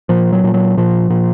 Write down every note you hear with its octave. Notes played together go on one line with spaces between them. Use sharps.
A#2 F3
F#3
A#2
F#3
A#2 F3
A#2